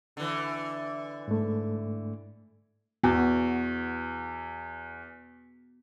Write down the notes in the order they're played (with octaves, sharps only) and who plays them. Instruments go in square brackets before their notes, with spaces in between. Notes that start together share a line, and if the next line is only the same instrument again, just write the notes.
[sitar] D3 E3
[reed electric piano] G#2 A3
[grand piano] E2 [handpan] B3 F#4